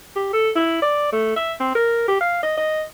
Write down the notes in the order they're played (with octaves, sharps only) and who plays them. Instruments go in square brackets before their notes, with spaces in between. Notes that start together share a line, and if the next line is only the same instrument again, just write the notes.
[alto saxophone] G4
A4
E4
D5
A3
E5
C4
A#4
G4
F5
D#5
D#5